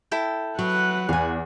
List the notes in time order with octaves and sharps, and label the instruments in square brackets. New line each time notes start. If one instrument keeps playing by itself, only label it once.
[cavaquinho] E4 A4 G5
[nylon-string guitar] F#3 [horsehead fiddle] B4 F#5
[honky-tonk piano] E2 [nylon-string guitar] F5 G#5